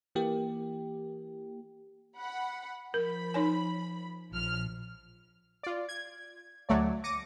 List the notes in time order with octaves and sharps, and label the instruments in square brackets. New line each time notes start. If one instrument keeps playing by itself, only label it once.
[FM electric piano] E3 A#3 G4
[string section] F#5 B5
[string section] F3 B5 [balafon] A#4
[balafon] D#4 C#5 G#5
[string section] A#1 F3 F6
[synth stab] F4 D5
G#6
D2 F#3 A3 C#5 D5
D6 A#6 C#7 D#7